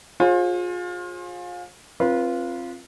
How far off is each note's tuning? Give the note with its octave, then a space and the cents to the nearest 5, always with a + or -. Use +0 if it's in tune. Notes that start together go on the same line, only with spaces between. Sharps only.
F4 +30 G#4 +0 C5 +40
C4 +25 F4 -10 B4 -30